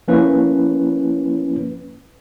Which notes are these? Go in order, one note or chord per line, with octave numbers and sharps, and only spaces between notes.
F3 A#3 C#4 E4 B4